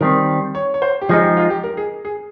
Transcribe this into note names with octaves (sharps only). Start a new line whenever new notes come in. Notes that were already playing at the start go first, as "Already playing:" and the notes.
D#3 G3 C4 A#4
C#5
C#5
C5
G4
F3 G#3 D#4 G#4
G4
F4
G4
A#4
G#4
G#4